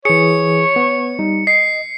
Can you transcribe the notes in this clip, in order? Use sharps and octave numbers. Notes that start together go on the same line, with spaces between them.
E3 G#4 C#5 C#7
B3
G3 D#4
D#5 C7